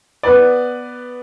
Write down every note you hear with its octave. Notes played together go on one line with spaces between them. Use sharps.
B3 B4 D5